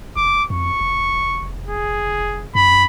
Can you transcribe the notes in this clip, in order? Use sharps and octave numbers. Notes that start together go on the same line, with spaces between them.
F1 D6
F2 C#6
F1
G#4
F#2 B5